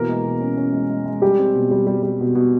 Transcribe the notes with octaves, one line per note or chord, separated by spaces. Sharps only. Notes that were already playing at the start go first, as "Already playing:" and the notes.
Already playing: B2 E3 A#3 A#4
G#3
B2
C#4
C#4
G#3
G#3
G#3
G3 G4
C4
B2
G3
G3
G3
B2
B2